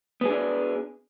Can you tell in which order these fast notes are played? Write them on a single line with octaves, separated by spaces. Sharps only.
B3 G#4 D4